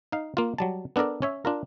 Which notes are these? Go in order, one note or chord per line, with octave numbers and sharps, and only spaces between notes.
D#4 F5
A#3 F4
F#3 G3 A5
B3 D4 A4 A#4 D5
C#4 C#5 E5
D4 F4 A#4